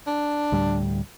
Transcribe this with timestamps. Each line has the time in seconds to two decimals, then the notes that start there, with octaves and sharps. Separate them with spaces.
0.07 D4
0.52 D2 A2 G3